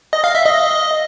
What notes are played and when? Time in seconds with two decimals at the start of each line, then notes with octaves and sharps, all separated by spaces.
0.13 D#5
0.24 F5
0.35 E5
0.45 D#5